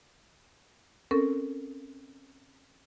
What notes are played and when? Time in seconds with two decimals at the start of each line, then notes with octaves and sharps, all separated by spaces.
1.11 C4 C#4 A4 A#4